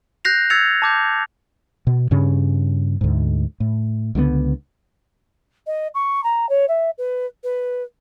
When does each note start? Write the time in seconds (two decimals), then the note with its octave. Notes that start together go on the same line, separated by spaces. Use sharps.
0.25 F#6 G6 A#6 C7 F7
0.50 E6 G#6 A6 C#7 F7
0.82 A5 D6 G6
1.87 B2
2.11 G2 C#3 C#4
3.01 D2 G#2
3.60 A2
4.15 C#2 D3 G3 B3
5.67 D#5
5.94 C#6
6.24 A#5
6.49 C#5
6.68 E5
6.98 B4
7.43 B4